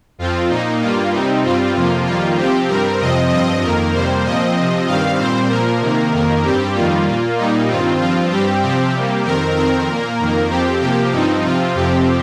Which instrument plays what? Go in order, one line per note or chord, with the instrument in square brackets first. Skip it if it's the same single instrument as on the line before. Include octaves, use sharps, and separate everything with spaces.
[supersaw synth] F2 F3 C4 F4
A#2 A#3 D#4
G2 G3 A#3 F4
C3 G3 C4 D#4
G2 G3 C4 F4
F2 C3 F3 A#3 F4
F2 D#3 G3 A#3 F4
C3 F3 C4 G4
G2 G3 C4 A#4
F2 C3 F3 C4 D#5
G2 F3 C4 D#5
F2 D#3 A#3 A#4
F2 C3 G3 A#3 C5
A#2 F3 C4 D#5
C3 F3 C4
G2 D#3 G3 C4 F5
A#2 G3 C4 C5
A#2 F3 A#3 A#4
C3 D#3 A#3
F2 D#3 A#3
G2 G3 C4 G4
F2 D#3 G3 A#3 F4
A#2 A#3
A#2 G3 A#3 D#4
G2 D#3 C4 F4
G2 F3 C4 F4
G2 G3 C4 G4
C3 F3 C4 G4
C3 G3 A#3
F2 D#3 C4 A#4
F2 D#3 C4 A#4
A#2 A#3
F2 D#3 A#3
F2 F3 C4 G4
C3 F3 A#3 G4
G2 F3 C4 D#4
C3 F3 C4 F4
F2 C3 F3 C4 G4